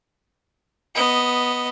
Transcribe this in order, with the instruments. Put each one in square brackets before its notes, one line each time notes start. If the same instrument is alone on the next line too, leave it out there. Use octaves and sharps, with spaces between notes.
[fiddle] B3 D#5